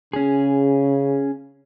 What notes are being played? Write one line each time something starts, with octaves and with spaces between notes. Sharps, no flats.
C#3 C#4 G#4